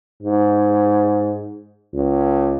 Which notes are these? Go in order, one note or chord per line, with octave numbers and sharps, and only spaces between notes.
G#2
C#2